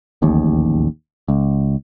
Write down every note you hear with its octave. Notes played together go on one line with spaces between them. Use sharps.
D1 A1 D#2
C#2